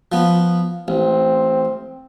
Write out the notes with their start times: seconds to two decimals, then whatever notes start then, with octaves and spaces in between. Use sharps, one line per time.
0.12 F3 B3
0.88 A1 C4